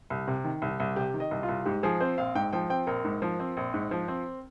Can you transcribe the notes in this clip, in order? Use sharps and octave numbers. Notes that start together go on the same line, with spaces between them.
C2
C3
D#3
C2
C2
C3 G4
D#3
D#5
C2
F4
C2
G#2 G4
F3 G#4
C4 C5
A#1 F5
G#2 G5
F3 G5
C4 G5
A#1 A#4
G#2
F3
C4
A#1
G#2
F3
C4